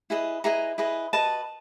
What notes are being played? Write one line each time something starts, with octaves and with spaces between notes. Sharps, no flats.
E4 G#4 B4 D#5
E4 G#4 B4 D#5 A#5
E4 G#4 B4 D#5
F#4 B4 D#5 A5